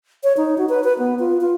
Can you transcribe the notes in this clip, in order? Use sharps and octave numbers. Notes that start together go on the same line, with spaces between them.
C#5
D#4
F#4
B4
B4
B3
F4
F4